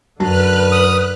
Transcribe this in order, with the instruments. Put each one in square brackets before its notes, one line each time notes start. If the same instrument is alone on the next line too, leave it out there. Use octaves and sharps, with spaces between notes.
[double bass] F#2 D3 [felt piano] F#3 A5 [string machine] B4 F6 F#6
[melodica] D#6